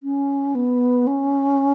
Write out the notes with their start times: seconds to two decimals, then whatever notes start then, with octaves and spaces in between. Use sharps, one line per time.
0.03 C#4
0.55 B3
1.07 C#4